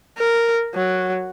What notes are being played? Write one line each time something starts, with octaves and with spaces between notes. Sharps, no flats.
A#4
F#3